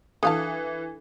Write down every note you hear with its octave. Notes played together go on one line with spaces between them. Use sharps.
E3 F#3 D4 A4 F5 A5